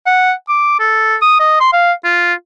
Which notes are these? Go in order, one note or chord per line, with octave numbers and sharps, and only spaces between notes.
F#5
D6
A4
D#6
D#5
C6
F5
F4